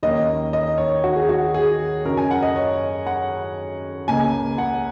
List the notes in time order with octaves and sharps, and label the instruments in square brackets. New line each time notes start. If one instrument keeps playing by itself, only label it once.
[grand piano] D#2 D#3 A#3 C#4 D#5
D#5
C#5
F#4
G#4
F#4
G#4
F#2 C#3 F#3 C#4 A#4
G#5
F#5
D#5
C#5
F#5
C#2 C#3 A#3 G#5
F#5